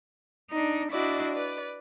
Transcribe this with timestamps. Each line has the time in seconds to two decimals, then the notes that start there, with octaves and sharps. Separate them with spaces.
0.51 D4 D#4
0.92 D4 E4 F#4 D5 D#5
1.34 B4 D5